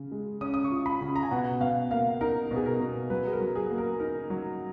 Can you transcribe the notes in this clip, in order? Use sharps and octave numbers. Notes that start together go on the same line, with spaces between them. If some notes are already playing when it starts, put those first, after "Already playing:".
Already playing: C#3
G#3
C#4 D#6
D#6
C#6
F4
B5
C#3
A#5
G#5
B2 F#5
B2 F5
A#3 F5
D#4 A#4
B2
G#4
A#4
B2
F#3 B4
G#4
A#4
F#3
G#4
A#3
A#4
D#4 A#4
F#3